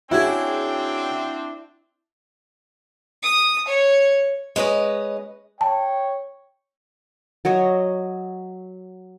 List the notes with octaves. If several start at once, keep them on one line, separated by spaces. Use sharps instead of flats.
C#3 C4 D4 E4 F#4 G#4 G5
D#6
C#5
G#3 C#4 B4 D#5
C#5 G5 A5
F#3 C#5 D#5